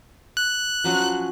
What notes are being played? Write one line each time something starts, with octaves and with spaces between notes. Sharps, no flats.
F#6
F3 F#3 C#4